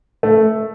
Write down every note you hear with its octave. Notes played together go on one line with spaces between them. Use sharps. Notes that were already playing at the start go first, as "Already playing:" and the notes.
A3